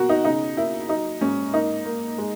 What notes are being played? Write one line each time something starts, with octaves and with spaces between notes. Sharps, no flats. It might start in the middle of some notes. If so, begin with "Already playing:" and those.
Already playing: B2 F#4 A#4
D#4
C#3 D#4
A#3 E4
F#3 D#4
G#2 C#4
A#3 D#4
A#3
G#3